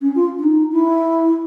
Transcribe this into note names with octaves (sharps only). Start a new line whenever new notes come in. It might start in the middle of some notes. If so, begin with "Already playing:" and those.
C#4
F4
D4
D#4
E4